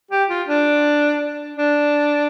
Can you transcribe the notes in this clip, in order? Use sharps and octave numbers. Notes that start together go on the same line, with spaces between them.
G4
F4
D4
D4